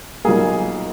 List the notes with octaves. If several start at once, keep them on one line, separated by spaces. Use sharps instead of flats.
B1 A#2 G3 A#3 G#4